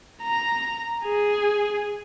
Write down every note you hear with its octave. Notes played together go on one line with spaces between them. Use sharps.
A#5
G#4